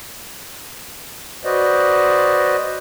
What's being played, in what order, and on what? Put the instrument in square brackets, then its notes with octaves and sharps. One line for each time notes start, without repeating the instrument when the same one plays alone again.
[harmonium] F#4 B4 C5 D5 D#5